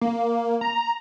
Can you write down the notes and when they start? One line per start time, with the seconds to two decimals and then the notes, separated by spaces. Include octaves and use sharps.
0.01 A#3
0.61 A#5